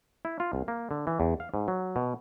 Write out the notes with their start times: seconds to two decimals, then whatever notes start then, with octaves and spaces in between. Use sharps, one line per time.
0.25 E4
0.40 F4
0.53 C2
0.68 A#3
0.91 D3
1.07 E3
1.20 E2
1.40 F5
1.54 G#2
1.68 F#3
1.96 B2